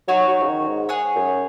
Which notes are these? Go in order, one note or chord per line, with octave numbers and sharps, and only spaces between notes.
F#3 D#4 F#4 C#5
F#3
C#3
D#3
G#2
G#4 C#5 F#5
F#2